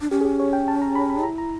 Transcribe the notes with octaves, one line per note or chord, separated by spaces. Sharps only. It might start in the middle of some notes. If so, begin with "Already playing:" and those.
D4
C#4 G4
G#4
G4
C#5
G5
A5
A#5
B5
B5
E4 A#5
A#5